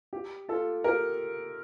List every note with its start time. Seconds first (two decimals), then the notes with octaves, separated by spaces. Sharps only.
0.13 G4
0.49 F4 A4
0.84 G4 A#4